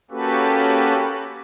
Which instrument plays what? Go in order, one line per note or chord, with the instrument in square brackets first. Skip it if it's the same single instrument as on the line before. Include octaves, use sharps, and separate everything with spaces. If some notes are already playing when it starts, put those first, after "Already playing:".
[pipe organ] A#3 C#4 F#4 G4 A4 B4